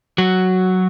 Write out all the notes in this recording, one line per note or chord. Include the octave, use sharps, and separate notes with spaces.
F#3 F#4